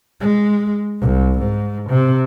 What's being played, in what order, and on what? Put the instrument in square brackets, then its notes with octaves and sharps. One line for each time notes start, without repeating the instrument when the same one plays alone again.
[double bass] G#3
C2
G#2
C3